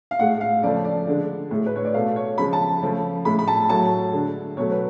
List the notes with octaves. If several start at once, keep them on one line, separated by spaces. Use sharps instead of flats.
F5
A2 G#3 F#5
F5
C#3 F3 A3 D5
D5
D3 G#3
A2 G#3
B4
C#5
D5
B2 A3 F5
C#5
C#3 F3 G#3 B5
A5
C#3 F3 A3
A2 G#3 B5
B5
A5
A2 F#3 A3 A5
D3 G#3
B2 F#3 A3 C#5
B4